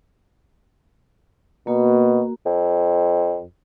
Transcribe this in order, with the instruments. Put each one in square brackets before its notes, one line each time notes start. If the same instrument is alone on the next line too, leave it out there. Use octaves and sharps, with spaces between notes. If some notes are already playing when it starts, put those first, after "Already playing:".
[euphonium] B2 [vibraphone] A#3 F#4 A#4
[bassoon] F2